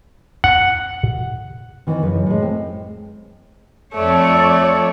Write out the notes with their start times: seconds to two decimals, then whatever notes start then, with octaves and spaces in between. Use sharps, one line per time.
0.44 F#5
1.87 D#3 E3 C4
2.03 F#2 C#3 B4
2.26 A2 G#3
2.42 C4
3.95 F2 A3 C#5 D5